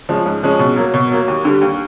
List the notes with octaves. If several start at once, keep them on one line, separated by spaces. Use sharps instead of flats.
F3 G#3 C#4
G#2
F3 G#3 C#4
B2
F#3 A#3
B2
F#3 A#3
D#2
D3 G3
D#2